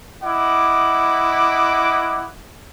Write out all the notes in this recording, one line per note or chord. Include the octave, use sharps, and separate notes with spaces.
E4 D#5 F#5 D6